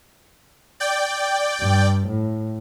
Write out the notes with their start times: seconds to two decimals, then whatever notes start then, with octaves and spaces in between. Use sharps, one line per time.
0.80 D5 G5
1.61 G2
2.08 A2